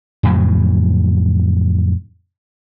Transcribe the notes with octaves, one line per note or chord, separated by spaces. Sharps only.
F2 A2 C#3 F#3